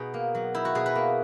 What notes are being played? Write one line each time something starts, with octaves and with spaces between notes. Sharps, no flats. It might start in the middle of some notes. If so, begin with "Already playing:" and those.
Already playing: B2 D#4 G#4
A#3
F#3
D#4 E4
F#4
B2 G#4
B4
A#3